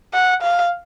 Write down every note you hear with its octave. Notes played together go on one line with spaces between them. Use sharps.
F#5
F5